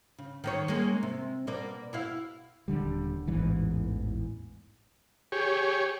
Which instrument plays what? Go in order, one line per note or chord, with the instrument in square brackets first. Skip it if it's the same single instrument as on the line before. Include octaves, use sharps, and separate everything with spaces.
[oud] C#3
D#3 A#3 C#5
G#3 A#3 C#4
C3
B2 A#3 D5
B2 E4 F5
[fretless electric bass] D#1 D3 G3
A1 E2 G#2 E3
[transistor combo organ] G4 G#4 C#5